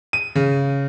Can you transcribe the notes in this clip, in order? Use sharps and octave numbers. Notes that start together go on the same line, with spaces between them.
D#7
C#3